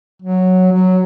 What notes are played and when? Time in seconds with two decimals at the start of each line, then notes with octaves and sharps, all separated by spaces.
0.22 F#3
0.72 F#3